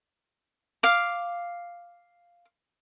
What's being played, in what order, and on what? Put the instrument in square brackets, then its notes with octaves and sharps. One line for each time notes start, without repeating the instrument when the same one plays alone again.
[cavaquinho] F5 D6